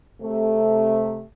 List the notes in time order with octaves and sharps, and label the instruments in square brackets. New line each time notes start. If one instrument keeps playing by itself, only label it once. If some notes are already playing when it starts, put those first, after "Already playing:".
[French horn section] C3 A3